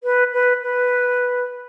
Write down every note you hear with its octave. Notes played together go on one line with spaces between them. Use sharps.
B4
B4
B4